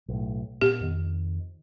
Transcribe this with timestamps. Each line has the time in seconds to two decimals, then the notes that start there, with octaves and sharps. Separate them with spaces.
0.08 B1 A2
0.61 A#2 B3 G4
0.81 F2 D#3